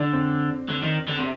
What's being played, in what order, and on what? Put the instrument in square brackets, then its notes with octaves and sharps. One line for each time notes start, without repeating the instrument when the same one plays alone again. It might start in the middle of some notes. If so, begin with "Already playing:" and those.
Already playing: [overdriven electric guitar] D3 [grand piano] D4
[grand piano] C4
[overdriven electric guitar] D3
D#3
D3
C3